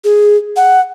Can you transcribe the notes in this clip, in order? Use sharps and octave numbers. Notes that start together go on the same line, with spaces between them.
G#4
F#5